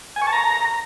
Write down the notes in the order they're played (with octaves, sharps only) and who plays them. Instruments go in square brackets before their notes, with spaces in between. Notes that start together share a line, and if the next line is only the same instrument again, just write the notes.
[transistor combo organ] G#5
C#6
A5
A#5